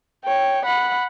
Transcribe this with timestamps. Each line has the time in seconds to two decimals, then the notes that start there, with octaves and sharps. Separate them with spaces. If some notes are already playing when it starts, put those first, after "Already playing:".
0.24 C#5 G5
0.65 F#5 B5